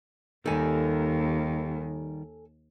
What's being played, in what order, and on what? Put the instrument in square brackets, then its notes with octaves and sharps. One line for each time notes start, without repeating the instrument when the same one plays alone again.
[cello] D#2 [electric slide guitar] D#3 G3 [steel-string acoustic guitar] A4 G#5